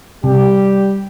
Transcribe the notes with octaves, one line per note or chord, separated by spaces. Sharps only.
C3 G3 G4